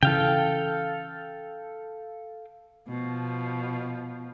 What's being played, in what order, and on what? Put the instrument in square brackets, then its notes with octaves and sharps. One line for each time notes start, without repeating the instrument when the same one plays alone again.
[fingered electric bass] C#3 E3 [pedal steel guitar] A4 F5 G5
[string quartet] B2 F3